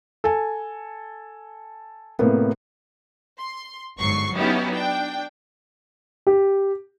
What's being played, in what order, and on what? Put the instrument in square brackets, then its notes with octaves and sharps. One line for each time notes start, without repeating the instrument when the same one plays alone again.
[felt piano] A4 G#5
A2 C3 A#3 B3
[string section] C6
G1 G#2 F#3 C#6 C7
F#3 B3 C#4 D#4 E4 G4
D4 G5
[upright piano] G4